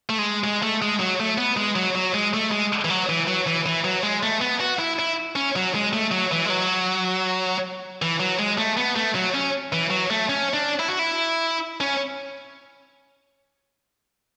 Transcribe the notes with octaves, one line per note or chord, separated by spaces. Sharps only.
A3
G#3
G#3
A3
G#3
F#3
A3
B3
G#3
F#3
F#3
G#3
A3
G#3
E3
F#3
E3
F#3
E3
E3
F#3
G#3
A3
B3
F#4
E4
E4
C#4
F#3
G#3
A3
F#3
E3
G#3
F#3
E3
F#3
G#3
A3
B3
A3
F#3
C#4
E3
F#3
A3
C#4
D4
E4
F#4
E4
C#4